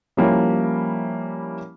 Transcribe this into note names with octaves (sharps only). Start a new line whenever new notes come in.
F3 G3 A#3 C#4 E4